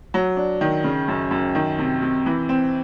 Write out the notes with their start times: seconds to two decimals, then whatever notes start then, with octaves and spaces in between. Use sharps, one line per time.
0.14 F#3
0.37 D4
0.61 D#3
0.84 C#3
1.08 F#2
1.31 F#2
1.55 D#3
1.79 C3
2.02 C3
2.26 E3
2.49 C4